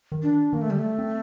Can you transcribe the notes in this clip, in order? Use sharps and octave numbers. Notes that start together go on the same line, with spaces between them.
D#3
D4
D#3 A#3
A3
D3 G3
A3
C4